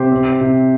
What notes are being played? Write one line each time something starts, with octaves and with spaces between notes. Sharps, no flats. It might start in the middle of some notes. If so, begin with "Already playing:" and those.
Already playing: C3 G4 C5
C4
C3